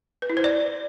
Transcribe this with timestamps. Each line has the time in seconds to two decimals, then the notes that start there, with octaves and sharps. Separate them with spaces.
0.22 B4
0.30 E4
0.37 C5
0.44 D5